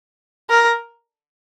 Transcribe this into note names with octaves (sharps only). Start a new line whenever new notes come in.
A#4